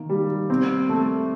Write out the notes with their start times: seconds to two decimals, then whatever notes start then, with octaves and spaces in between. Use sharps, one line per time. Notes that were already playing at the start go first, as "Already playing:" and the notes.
Already playing: D#3 A#3
0.09 G3
0.50 C4
0.89 A3